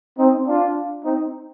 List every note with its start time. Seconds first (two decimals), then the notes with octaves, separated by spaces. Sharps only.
0.17 C4 D#4
0.46 D4 F4
1.03 C4 D#4